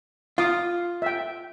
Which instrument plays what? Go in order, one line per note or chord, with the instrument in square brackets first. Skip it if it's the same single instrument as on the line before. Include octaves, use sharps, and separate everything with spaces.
[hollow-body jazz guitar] F4 [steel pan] F5 D6 D#6
[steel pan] E5 G5